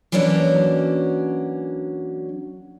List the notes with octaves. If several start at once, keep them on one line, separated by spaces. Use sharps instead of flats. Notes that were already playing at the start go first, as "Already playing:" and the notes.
E3 F#3 A#3 C#4 D4 F#4